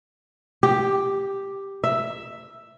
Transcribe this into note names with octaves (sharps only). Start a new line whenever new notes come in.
G4
E5